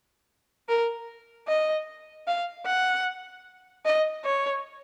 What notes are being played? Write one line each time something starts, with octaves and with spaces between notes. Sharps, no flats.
A#4
D#5
F5
F#5
D#5
C#5